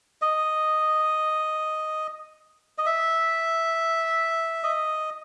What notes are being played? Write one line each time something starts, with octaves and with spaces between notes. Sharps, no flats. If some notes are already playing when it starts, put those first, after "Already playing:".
D#5
D#5
E5
D#5